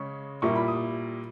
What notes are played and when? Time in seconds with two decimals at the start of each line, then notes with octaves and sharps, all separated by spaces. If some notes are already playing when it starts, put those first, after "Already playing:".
Already playing: C#3 G#3 C#4 C#6
0.42 A#2 G3 A#3 E4 C#6
0.55 B5
0.68 D#6